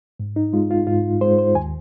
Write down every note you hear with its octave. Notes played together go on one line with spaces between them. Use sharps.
G#2
D#4
G#3 F4
F4
G#2 F4
G#3 C5
C5
D#2 G#5